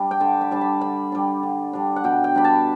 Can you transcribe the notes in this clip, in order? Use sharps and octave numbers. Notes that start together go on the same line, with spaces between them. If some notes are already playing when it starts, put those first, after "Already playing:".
Already playing: G3 D4
G5
D3 A5
B5
G3 D4 A5
B5
D3 B5
G3 D4
D3
G3 D4
F#5
B2 G5
G5
G3 D4 B5
A5